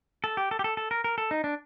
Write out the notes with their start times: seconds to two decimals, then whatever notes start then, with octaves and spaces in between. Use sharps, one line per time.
0.24 A4
0.37 G4
0.51 A4
0.59 G4
0.64 A4
0.77 A4
0.91 A#4
1.04 A#4
1.18 A4
1.31 D#4
1.44 D4